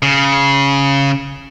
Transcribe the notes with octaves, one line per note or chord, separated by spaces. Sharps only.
C#3